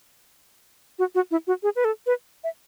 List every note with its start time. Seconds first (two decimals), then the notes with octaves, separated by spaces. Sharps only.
0.99 F#4
1.15 F#4
1.31 E4
1.47 F#4
1.63 G#4
1.76 B4
1.85 A4
2.06 B4
2.44 E5